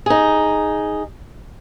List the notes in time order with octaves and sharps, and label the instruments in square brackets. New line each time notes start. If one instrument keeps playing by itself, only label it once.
[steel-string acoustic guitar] D#4 G#4